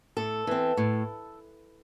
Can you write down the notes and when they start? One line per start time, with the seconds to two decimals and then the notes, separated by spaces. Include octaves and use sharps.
0.17 A2 A4
0.47 E3 C4
0.77 A2